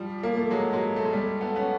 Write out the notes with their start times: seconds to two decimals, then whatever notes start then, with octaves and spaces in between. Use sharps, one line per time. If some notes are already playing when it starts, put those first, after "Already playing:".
Already playing: F3 G3
0.23 A#3
0.37 A3
0.50 F#3 G#3
0.73 F#3 G#3
0.96 A3
1.05 G#3
1.13 G3 A3
1.41 A3 B3
1.56 B3 C#4